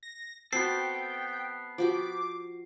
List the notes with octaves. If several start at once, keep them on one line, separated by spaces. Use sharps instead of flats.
A#6
B3 C4 F#4 A4 G5 C7
F3 F#4 G4 D6